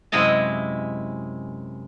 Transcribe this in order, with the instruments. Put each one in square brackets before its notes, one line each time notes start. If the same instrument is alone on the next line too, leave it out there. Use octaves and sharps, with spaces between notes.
[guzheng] F#2 C3 G#3 E4 D#5 A5